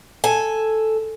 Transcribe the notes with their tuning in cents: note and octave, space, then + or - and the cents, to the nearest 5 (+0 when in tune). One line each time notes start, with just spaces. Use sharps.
A4 +0 G#5 +0